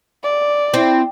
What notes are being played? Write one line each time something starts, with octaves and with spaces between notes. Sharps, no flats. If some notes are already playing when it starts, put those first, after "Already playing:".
D5
C4 E4